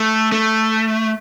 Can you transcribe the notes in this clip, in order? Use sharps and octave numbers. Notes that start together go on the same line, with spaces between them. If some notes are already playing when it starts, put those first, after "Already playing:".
Already playing: A3
A3